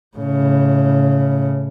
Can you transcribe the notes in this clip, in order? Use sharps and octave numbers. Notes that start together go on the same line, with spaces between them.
A2 C#3